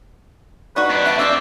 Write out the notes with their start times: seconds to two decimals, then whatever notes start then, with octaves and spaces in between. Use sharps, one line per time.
0.76 A3 D#4 F#4 B4 D5
0.90 F2 D4
1.05 E5
1.19 C4 D4 G#4 D5 E6